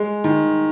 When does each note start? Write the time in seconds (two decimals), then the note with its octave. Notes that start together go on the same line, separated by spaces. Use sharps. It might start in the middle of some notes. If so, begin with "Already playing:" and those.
Already playing: G#3
0.24 D#3